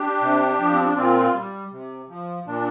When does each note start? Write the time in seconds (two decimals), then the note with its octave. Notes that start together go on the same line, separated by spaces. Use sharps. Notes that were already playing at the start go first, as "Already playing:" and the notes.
Already playing: D4 G4
0.22 C3
0.60 F3
0.73 C4
0.85 D4
0.96 A#2 C4 F4
1.34 G3
1.72 C3
2.09 F3
2.47 A#2 D4